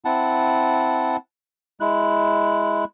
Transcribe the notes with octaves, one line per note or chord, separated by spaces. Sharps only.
C4 E4 F#5 A5
G#3 E4 F#6